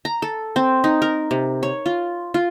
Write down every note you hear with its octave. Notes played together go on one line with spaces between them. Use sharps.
A#5
A4
C4
D#4
A#4
C3
C#5
F4
F4